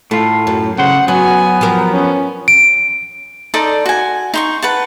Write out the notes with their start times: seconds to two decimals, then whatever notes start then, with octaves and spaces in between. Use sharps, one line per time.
0.11 A2 A3 F4
0.47 F#2
0.78 C#3 C5 F#5
1.08 F#3 B3 F#4 G#5
1.61 F3 G4 A#4
1.93 C#4
2.48 D7
3.54 D#4 A4 D5 C6
3.86 F#4 G#5
4.34 D#4 C6 C#6
4.62 B4 F#5 A5